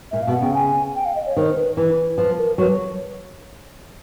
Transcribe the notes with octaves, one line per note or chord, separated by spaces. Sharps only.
A#2 E5
F5
B2
F#5
C#3 G5
G#5
G5
F5
D#5
C#5
D#3 C5
B4
E3
F3 B4
A#4
F#3 B4